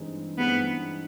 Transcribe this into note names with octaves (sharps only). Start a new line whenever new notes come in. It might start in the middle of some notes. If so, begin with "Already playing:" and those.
Already playing: G2 E3 G#3 C4 D#4
G2 E3 G#3 B3 C4 D#4